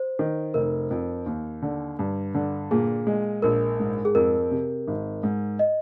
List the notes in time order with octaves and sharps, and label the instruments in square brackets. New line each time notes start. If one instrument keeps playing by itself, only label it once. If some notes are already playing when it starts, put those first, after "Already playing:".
Already playing: [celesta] C5
[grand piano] D#3
[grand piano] F1 [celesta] A#4
[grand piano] F2
D#2
D3
G2
D3
[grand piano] A#2 [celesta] G#4
[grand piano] G#3
[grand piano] A#1 [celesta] A#4
[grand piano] G#2
[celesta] G#4
[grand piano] F2 [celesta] A#4
[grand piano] C3
G#1
G#2
[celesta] D#5